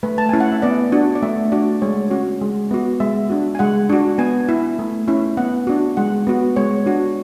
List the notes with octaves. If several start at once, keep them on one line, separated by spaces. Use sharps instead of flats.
A3 B4
A5
C#4 E4 G#5
F#5
E5
B3 D5
D4 F#4
D5
A3 E5
D4 F#4 D5
G#3 C#5
C#4 F#4
G#3
B3 F#4
G#3 E5
D4 F#4
G#5
G#3 F#5
D4 F#4
B3 G#5
E4
A3
C#4 E4
B3 F#5
D4 F#4
G#3 F#5
B3 F#4
G#3 C#5
D4 F#4